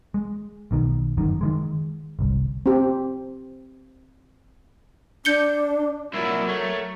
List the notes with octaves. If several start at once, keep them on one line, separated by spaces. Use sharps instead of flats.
G#3
B1 B2 D#3
G1 F#2 D#3
D#3 E3 G#3
G1 C2
C4 G4
D4 G6 C#7 G7
C2 A#2 F#3 E4 A#4
A3 C#5